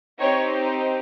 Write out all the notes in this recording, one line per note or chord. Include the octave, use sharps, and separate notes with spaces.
C4 D#4 G4 C#5